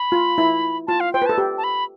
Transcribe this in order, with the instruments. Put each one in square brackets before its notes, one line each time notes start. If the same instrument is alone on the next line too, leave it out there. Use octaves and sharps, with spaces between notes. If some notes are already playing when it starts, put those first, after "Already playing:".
Already playing: [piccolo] B5
[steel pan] F4
E4
[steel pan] F4 [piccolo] A5
[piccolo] F5
[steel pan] C5 [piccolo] G5
[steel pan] B4
[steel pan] A4 [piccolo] A5
[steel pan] G4
[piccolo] A5
B5